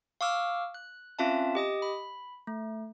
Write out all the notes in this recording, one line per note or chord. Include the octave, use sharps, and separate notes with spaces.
F5 C#6 D6 E6 F6
F#6
C4 C#4 F4 E5 F5 A5
G4 D#5 D#6
B5
A3